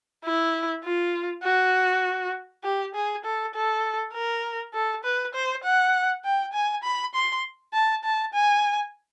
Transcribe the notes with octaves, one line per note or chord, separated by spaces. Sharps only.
E4
F4
F#4
G4
G#4
A4
A4
A#4
A4
B4
C5
F#5
G5
G#5
B5
C6
A5
A5
G#5